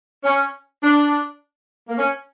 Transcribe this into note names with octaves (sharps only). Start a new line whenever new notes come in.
C#4
D4
A#3
C#4